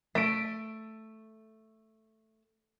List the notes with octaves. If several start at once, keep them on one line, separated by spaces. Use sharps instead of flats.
A3 B6 D7